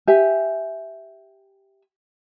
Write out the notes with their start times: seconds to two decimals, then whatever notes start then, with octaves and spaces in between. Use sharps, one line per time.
0.07 G4 E5 G#5